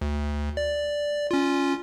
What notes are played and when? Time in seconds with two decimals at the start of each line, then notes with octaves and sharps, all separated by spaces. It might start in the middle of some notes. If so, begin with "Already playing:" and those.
0.01 D2
0.57 D5
1.31 C#4 F4